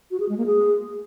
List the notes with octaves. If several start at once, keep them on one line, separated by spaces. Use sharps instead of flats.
F#4
G#4
G#3
A#3
G#4